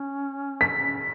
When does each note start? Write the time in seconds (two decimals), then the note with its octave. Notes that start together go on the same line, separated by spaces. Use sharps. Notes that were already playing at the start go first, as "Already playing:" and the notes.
Already playing: C#4
0.61 B6